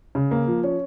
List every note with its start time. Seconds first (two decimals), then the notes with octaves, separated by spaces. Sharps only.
0.15 C#3
0.31 A#3
0.47 F3
0.64 C#4